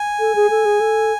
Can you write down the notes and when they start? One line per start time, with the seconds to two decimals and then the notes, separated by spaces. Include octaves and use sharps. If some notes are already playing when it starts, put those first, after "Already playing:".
Already playing: G#5
0.20 A4
0.35 G#4
0.50 A4
0.65 G#4
0.80 A4